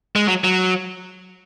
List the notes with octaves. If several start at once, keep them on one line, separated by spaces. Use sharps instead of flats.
G#3
F#3
F#3